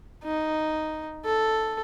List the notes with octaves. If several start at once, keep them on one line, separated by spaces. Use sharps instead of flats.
D#4
A4